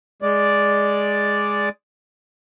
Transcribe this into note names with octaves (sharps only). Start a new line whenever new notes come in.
G#3 D5